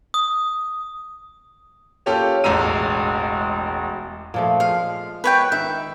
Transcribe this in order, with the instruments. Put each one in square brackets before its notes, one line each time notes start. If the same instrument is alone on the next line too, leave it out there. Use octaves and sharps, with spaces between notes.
[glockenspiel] D#6
[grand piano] A#3 C#4 F4 G4 A4
E1 A1 G#3 A#5 E6 D#7
[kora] A#2 F3 A3
[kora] G#3 [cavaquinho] F5
[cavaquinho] B4 C#5 G5
[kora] D#3 [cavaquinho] E5